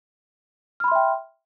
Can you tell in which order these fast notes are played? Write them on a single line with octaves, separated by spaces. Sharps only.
F6 B5 C6 E5 G5